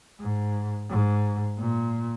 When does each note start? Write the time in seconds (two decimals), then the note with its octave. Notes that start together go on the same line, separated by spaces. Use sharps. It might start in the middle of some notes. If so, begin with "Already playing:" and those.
0.20 G#2
0.90 G#2
1.58 A#2